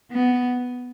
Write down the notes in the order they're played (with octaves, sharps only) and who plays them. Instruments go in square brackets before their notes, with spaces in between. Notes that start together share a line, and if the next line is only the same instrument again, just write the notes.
[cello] B3